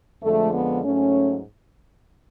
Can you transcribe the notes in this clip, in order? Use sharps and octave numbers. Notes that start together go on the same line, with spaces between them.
F2 D3 F3 G#3 A3
B3
G#2 F#3 A3 C#4